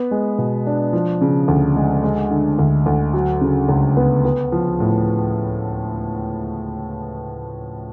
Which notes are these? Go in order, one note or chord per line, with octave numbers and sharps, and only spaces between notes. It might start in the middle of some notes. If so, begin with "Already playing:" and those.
Already playing: B3
G#3
B2
D4
F3
C#3
D2
G#3
G#3
D3
D2
D2
F#3
C#3
C#2
B3
B3
F3
A2